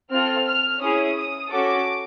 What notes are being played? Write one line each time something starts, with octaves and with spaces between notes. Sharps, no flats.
C4 F4 A4 F6
F6
C#4 E4 G#4 D#6
D#6
C#4 F#4 A4 D6